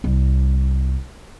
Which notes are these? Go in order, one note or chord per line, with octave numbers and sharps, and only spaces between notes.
C2 G3